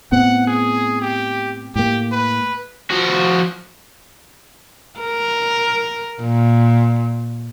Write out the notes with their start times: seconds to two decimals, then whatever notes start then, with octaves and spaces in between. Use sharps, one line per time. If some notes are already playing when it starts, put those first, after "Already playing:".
0.12 A2 B3 C4 F#5
0.47 G#4
1.02 G4
1.76 A2 A#3 G4
2.12 B4
2.91 F3 F#4
5.00 A#4
6.21 A#2